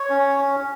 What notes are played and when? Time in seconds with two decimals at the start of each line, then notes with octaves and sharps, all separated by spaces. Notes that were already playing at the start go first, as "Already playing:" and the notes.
Already playing: C#5
0.10 C#4